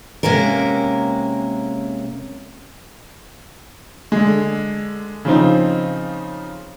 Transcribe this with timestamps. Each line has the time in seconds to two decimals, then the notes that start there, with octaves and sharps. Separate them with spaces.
0.23 C3 G#3 A#3 C#4 A#4
4.12 D3 G#3
5.25 C#3 F3 C4 D#4